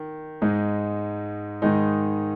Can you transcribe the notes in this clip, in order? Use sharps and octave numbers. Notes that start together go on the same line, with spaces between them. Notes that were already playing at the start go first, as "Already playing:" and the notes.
Already playing: D#3
G#2 G#3 D#4
G#2 D#3 G#3 D#4